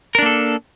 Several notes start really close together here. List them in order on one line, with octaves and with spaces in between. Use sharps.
A#4 D4 A#3 A4